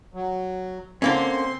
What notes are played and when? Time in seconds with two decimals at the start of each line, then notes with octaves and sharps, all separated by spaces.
0.14 F#3
1.02 D3 A#3 C4 C#4 C6